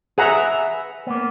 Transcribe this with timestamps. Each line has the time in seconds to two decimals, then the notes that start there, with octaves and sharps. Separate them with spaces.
0.18 G#4 B4 E5 F#5 A#5
1.07 A#3 B3